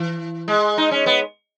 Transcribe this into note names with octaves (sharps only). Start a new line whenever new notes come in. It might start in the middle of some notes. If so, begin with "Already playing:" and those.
Already playing: E3
G#3
D#4
C#4
B3